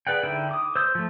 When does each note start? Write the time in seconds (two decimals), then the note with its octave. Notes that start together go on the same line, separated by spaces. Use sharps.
0.07 G#4 B4 D5 F#5 G5
0.23 D3 D#4 E4 G5
0.51 D6 D#6
0.76 C5 E6 G6
0.95 F3 A3